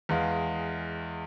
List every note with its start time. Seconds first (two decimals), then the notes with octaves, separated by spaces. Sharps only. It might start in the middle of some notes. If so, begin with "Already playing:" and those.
0.09 E2 G#3 F5